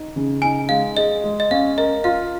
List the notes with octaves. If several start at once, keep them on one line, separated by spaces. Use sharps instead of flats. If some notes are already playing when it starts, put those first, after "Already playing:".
Already playing: D#4
C#3
D#4 G#5
G#3 F5
G#4 D#5
G#3
D#5
C#4 F5
A#4 D#5
F4 F5